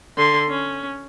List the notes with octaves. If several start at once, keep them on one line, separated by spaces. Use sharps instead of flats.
D3 C6
C#4